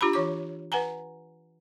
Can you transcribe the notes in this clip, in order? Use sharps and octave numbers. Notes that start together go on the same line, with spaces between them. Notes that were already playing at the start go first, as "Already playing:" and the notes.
D4 F4 G4 A#5 B5
E3 C#5 D6
B4 F#5 G#5 A#5